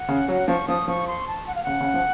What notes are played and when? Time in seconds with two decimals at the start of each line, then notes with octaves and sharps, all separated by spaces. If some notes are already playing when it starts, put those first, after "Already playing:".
Already playing: F#5
0.08 C#3
0.29 F#3
0.48 F3 C#6
0.68 F3 D#6
0.88 F3 C#6
1.07 C6
1.27 A5
1.47 F#5
1.55 F5
1.63 C#3 F#5
1.80 C#3
1.94 F3